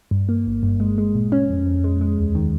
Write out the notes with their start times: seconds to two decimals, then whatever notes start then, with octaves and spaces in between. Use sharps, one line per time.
0.11 G2
0.29 A#3
0.47 G1
0.63 G2
0.80 G#3
0.98 G#3
1.15 A#2
1.32 C#4
1.49 F2
1.66 F2
1.84 G#3
2.01 G#3
2.18 D#2
2.35 D#3